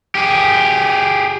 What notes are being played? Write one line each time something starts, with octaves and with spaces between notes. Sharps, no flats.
G4 G#4